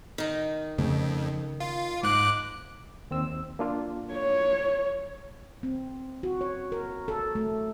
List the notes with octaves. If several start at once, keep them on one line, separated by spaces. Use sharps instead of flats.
D#3 D#4
F2 C#3 A3
F4
G#2 D6 F#6
D#2 C4 E6
A#3 D4 F4
C#5
C4
F#4
C#5
A#4
A4
A3